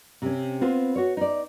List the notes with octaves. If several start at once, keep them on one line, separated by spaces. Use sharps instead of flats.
C3 C#4
B3 C4 F4 B4
F#4 C#5
D#4 D5